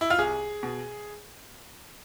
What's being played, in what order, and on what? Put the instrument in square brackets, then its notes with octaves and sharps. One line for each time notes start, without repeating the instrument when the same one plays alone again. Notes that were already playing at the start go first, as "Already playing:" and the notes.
[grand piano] E4
F4
C2 G#4
B2